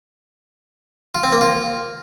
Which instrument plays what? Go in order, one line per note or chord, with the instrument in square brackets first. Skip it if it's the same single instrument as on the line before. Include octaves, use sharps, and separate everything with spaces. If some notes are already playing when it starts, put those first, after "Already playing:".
[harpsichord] F4
C4
A#3
F4